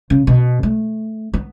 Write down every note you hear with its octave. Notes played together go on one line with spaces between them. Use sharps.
C#3
B2
A3
B3